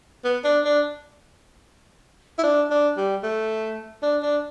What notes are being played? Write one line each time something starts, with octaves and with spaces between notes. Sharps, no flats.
B3
D4
D4
E4
D4
D4
G3
A3
D4
D4